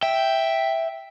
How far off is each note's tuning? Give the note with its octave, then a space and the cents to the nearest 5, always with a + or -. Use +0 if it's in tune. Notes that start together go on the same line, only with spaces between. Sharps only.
E5 +0 G5 +0